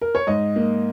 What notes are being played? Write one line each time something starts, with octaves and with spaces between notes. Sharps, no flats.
A#4
C#5
G#2 D#5
A#3